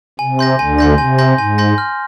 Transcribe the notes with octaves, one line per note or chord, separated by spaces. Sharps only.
C3 G#5
C6 G6 A#6
D2 D3 G#5
C6 G6 A#6
C3 G#5
C6 G6 A#6
G#2 G#5
C6 G6 A#6
F6